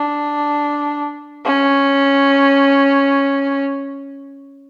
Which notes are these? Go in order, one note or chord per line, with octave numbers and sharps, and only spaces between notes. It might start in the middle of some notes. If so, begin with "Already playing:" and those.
Already playing: D4
C#4